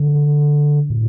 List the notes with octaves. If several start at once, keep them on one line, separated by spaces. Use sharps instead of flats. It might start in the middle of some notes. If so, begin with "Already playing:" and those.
Already playing: D3
A2